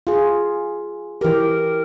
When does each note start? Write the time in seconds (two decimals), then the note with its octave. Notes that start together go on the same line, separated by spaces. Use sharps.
0.07 F4 G#4
1.21 E3 G4 A#4